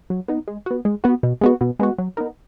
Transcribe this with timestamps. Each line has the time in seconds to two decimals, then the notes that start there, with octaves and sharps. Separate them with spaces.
0.10 F#3
0.28 B3 D#4
0.48 G#3
0.66 B3 F#4
0.85 G#3
1.04 B3 F#4
1.23 B2
1.41 G#3 B3 F#4
1.61 B2
1.79 G#3 B3 F#4
1.98 F#3
2.17 B3 D#4 A#4